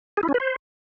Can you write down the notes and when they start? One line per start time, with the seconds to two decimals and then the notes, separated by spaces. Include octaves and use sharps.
0.17 G#4
0.23 E4
0.29 C#4
0.34 B4
0.40 C5